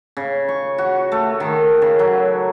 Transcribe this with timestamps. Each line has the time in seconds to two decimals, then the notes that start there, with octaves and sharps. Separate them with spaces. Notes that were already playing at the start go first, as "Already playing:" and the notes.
0.17 C#3
0.48 C#6
0.78 F#4
1.12 A3
1.40 D#3
1.82 C#3
1.99 F#3